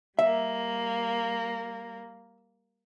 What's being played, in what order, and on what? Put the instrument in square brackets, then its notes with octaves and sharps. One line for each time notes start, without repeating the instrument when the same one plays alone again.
[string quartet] G3 A#3 [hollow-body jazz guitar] E5